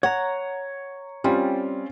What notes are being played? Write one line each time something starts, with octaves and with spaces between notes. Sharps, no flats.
C#5 F#5 A#5
G3 C4 C#4 F4